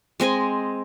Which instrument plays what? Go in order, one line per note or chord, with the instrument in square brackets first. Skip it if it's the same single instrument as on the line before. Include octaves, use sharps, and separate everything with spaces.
[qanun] G#3 C4 D#5 G#5